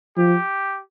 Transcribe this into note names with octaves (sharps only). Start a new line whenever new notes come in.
F3 G4